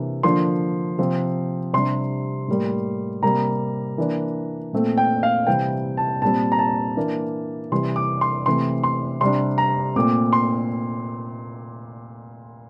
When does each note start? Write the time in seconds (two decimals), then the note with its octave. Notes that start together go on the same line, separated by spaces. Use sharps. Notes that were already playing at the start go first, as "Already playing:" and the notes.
Already playing: C3 E3 A#3 D4
0.23 D3 F3 A#3 D4 C6
0.99 C3 F3 C4
1.73 C3 G3 D4 C6
2.48 A2 G3 A#3
3.22 C3 G3 A#3 A#5
3.98 E3 A#3 D4
4.73 A#2 A3 C4
4.98 G5
5.23 F5
5.47 C3 E3 G3 C4 G5
5.97 A5
6.22 A#2 G3 C4 A5
6.52 A#5
6.59 A5
6.97 E3 A#3 D4
7.72 C3 E3 G3 C6
7.96 D6
8.21 C6
8.46 C3 E3 A3 C4 C6
8.83 C6
9.21 C3 G3 D4 C6
9.58 A#5
9.96 A#2 A3 C4 D6
10.33 C6